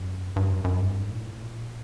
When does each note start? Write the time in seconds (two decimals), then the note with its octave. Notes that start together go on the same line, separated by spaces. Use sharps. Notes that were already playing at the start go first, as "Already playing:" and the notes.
Already playing: F#2
0.36 G2
0.51 F#2
0.64 F#2
0.78 G2
1.00 G#2
1.11 A#2
1.21 A2
1.42 A#2